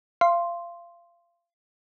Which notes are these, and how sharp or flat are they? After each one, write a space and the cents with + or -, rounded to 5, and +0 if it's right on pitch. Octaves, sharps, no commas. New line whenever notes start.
F5 -30 C6 +0